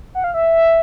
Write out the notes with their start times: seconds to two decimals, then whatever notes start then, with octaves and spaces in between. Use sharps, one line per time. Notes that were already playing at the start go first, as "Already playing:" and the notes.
0.15 F#5
0.24 F5
0.34 E5